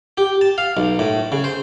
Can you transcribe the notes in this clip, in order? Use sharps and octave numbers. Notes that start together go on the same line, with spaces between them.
G4
A5
F5
B1
A2
C#3
C5